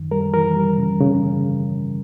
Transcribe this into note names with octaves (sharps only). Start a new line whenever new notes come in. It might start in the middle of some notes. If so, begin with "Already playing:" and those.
Already playing: F#2 D#3
G3 A#4
E3 A#4
G3
C#3
C#3